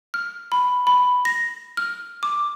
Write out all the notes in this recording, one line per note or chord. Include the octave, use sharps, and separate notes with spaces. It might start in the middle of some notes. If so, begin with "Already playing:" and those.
F6
B5
B5
A#6
F6
D6